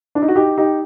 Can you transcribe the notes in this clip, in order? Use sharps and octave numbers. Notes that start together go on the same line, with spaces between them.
D4
D#4
F#4
D#4 G4
D#4 G4